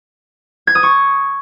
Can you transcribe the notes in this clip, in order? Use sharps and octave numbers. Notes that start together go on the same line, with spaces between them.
G#6
D#6
C#6